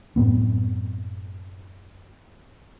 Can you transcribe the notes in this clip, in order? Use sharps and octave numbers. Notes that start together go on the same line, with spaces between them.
F#2 A2 B3 C4